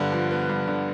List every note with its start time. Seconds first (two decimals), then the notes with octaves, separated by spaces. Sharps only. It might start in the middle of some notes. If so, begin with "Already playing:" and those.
Already playing: G2 D3 B3
0.12 F3
0.31 B3
0.49 G2
0.68 D3